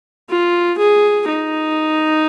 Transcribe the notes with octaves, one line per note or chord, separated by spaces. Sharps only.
F4
G#4
D#4